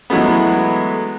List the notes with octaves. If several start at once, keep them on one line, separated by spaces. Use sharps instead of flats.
E3 F#3 G#3 A3 B3